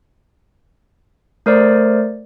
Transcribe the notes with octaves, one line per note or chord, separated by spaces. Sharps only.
A3 A#4 C5 D5